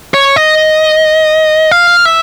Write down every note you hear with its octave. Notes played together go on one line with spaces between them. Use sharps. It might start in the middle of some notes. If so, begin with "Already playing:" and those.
C#5
D#5
F5
E5